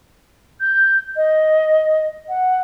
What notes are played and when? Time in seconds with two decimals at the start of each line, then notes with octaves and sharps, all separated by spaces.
0.60 G6
1.16 D#5
2.29 F#5